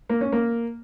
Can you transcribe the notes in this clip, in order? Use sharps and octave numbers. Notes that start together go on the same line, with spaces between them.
A#3
C#4
A#3